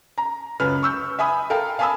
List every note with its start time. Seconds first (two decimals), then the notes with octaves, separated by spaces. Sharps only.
0.18 A#5
0.60 C#2 F#2 B4 F6
0.83 C#6 E6 G6
1.19 E5 G#5 B5 D#6
1.50 A4 A#4 F5 G5
1.79 F5 G#5 A5 B5 D#6 E6